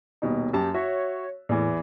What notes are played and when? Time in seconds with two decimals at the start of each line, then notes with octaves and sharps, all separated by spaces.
0.22 D#1 B2 D#4
0.53 F#2 G4 A5
0.74 F#4 C#5 E5
1.49 E2 A2 E3